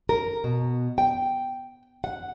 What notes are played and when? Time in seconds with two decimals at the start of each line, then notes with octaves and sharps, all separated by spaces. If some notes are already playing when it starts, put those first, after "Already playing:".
0.09 A#4
0.44 B2
0.98 G5
2.04 F#5